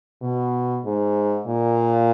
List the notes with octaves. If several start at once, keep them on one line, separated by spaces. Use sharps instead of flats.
B2
G#2
A#2